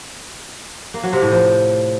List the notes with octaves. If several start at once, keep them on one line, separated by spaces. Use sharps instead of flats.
A#3
F#3
C3
A2
F3